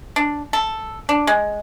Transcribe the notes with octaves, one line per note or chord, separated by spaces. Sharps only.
D4
A4
D4
G#3